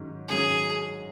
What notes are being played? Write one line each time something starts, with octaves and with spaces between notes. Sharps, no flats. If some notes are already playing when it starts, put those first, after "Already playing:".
Already playing: G#2 D#3 F#3 C#4
G#2 D#3 F#3 C#4 G#4